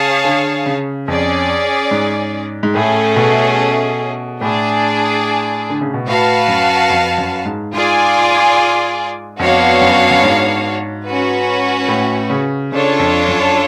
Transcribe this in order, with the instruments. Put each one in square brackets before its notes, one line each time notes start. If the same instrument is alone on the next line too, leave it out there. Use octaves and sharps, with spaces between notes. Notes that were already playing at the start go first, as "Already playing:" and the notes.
Already playing: [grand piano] C#3 [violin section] G#4 C#5 F5 A5
[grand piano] D3
C#3
[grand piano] F2 [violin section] C#4 G#4 D5
[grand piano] G#2
G#2
[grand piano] A2 [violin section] A3 C#4 G#4
[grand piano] B2
[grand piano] A2 [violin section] D4 G#4 D5
[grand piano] D3
C#3
B2
[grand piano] A2 [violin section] F#4 B4 F5 A5
[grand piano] F#2
F2
F#2
G#2
[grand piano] G#2 [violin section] F4 G#4 D5 G#5
[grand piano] F2 [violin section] B3 D4 F#4 C#5 F5
[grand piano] F#2
F#2
G#2
[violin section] C#4 F#4 B4
[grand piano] A2
C#3
[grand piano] C#3 [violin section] D4 F4 A4 C#5
[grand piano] F2
F#2